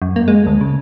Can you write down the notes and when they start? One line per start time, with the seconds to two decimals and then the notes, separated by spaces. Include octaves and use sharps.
0.02 F#2
0.16 A#3
0.28 G#3
0.47 D2
0.61 C#3